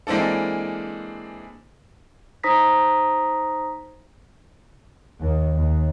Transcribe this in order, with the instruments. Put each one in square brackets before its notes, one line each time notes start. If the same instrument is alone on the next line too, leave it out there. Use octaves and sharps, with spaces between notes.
[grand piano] E3 G#3 A#3 C4 D4 A4
[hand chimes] D#4 C5 A#5 D#6 A#6 B6
[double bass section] D#2
D#2